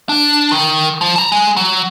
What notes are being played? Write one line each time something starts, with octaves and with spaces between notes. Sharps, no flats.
D4
D#3
F3
A5 A#5
G#3
F#3